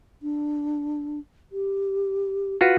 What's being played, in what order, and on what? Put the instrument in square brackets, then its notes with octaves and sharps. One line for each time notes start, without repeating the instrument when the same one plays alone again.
[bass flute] D4
G4
[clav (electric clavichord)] F4 F#4 B4